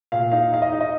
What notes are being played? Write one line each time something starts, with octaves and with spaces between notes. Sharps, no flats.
A#2 F5
D#4 F5
D#4 F5
D#5
D#4
D#5